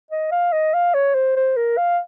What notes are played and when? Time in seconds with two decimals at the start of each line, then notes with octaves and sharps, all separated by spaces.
0.11 D#5
0.31 F5
0.52 D#5
0.74 F5
0.94 C#5
1.15 C5
1.36 C5
1.57 A#4
1.78 F5